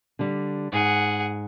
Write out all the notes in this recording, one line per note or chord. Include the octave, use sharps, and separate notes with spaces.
D3 G3
G#2 G#4 F#5